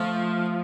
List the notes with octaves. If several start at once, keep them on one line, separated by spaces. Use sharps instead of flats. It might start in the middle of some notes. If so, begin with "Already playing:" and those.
Already playing: F3 A3